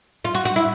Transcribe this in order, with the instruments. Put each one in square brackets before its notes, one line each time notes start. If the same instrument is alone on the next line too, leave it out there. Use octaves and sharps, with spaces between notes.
[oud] F4
F#4
F#4
E4